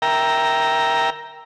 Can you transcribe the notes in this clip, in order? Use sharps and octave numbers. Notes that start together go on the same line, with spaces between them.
A#4 E5 G5 A#5